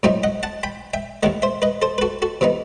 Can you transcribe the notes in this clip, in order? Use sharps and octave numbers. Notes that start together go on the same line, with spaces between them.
A2 F#3 C4 D#4 E5 G5
D#5 F#5
F#5 A5
G5 B5
E5 G5
D#2 D#3 A3 D#5 F#5
C5 E5
B4 D#5
A4 C5
B4
F#4 A4
F#4 A4
C3 E3 B3 D#4